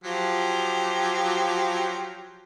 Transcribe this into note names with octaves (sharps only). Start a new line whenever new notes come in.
F3 F#3 G4